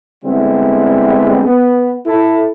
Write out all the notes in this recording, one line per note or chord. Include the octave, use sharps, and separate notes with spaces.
D3 G3 G#3 B3 C4 E4
B3
E4 A4